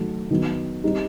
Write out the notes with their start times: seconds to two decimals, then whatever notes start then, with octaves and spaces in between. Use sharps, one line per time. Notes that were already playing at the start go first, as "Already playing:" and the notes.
Already playing: D#3 F#3 A3
0.31 D#3 F#3 B3
0.84 G3 C4 D#4 G4